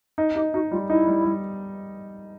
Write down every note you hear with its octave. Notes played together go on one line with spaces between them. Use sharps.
D#4
D#4 G4
D#4 F#4
G3 F4
D#4 E4
G3
G3